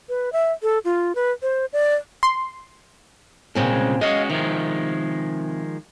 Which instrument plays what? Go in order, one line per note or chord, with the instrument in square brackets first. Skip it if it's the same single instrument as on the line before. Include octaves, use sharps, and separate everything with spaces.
[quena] B4
E5
A4
F4
B4
C5
D5
[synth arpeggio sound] C6
[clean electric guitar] C2 C#3 G#3 [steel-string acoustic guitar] A#2 C4 C#4
[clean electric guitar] G#3 C#4 F#4 [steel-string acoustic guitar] D#5 F5
[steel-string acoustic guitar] C3 [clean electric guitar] D#3 F3 G#3